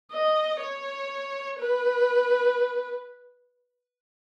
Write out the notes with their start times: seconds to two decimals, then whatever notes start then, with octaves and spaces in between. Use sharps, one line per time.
0.11 D#5
0.60 C#5
1.58 B4